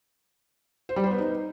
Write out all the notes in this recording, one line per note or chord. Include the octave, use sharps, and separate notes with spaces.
C5
G3
C5
B3
D#4